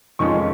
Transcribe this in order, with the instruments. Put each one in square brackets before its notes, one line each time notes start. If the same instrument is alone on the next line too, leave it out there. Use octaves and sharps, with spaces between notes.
[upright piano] F2 D#3 G#3 C#4 F4 C#6